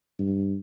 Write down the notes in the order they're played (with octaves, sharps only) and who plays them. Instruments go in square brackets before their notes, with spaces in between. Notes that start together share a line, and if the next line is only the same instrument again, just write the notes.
[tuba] G2